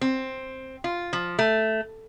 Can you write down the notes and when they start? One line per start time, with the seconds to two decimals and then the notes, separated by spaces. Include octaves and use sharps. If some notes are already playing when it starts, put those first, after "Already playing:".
0.01 C4
0.84 F4
1.13 F3
1.39 A3